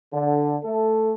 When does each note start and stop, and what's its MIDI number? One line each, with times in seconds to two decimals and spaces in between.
0.13 0.57 50
0.63 1.14 57
0.63 1.14 69